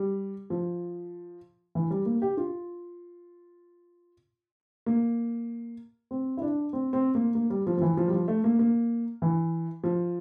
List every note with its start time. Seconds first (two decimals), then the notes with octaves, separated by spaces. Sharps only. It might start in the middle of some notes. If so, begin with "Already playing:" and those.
Already playing: G3
0.50 F3
1.75 E3
1.91 G3
2.06 A#3
2.22 G4
2.37 F4
4.86 A#3
6.11 C4
6.37 E4
6.42 D4
6.73 C4
6.93 C4
7.15 A#3
7.35 A#3
7.50 G3
7.67 F3
7.77 F3
7.82 E3
7.97 F3
8.08 G3
8.13 F3
8.28 A3
8.44 A#3
8.59 A#3
9.22 E3
9.84 F3